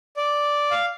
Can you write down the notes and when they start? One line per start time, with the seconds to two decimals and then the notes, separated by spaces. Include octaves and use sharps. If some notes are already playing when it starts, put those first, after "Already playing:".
0.17 D5
0.71 F5